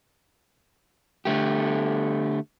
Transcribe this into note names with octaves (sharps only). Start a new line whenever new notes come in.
D3 A3 G4